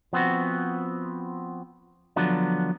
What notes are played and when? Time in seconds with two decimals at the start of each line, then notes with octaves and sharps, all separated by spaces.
0.13 F3 B3 C4 F#4
2.16 D3 F3 F#3 B3 D4